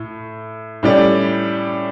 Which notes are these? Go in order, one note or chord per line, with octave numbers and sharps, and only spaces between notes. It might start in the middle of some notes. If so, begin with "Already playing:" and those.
Already playing: A2
A2 G3 C#4 G4 D5